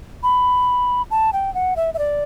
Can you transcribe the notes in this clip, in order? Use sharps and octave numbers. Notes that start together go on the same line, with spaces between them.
B5
A5
G5
F#5
E5
E5
D5